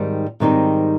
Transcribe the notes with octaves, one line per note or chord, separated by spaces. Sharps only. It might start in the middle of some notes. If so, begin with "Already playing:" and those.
Already playing: G#2 D#3 G3 C4 D#4
G#2 D#3 G3 C4 D#4